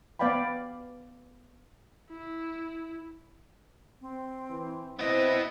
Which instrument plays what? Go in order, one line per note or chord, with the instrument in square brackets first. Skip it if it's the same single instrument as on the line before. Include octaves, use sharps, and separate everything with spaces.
[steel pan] B3 B4 D5 F5 G5 B5
[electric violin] E4
[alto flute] C4
[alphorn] E3
[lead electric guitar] B3 D#5 [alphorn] C4 [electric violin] E4 [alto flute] B4